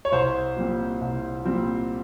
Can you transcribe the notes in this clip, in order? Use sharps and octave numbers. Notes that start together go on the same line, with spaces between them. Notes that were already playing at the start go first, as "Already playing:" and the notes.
C#5
C2 C5
A#2 G3 C4
C2
A#2 G3 C4